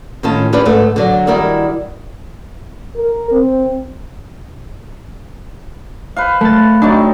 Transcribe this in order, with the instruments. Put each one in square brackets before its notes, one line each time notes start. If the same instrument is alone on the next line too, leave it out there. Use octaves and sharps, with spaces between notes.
[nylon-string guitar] A2 D#3 C#4 F4 A5
C#4 D4 G4 B4 C5 D5
D2 G#2 A3 B4
D3 F#3 D5
D#3 G3 E4 F#4 A#4 D5
[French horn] A#4
C4
[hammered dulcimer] B4 C5 F5
[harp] A3 A6
[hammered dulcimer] F#3 C4 D#4 [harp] D4